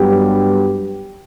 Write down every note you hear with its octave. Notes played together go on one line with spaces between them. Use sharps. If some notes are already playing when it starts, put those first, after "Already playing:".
Already playing: G2 F#3 B3 G4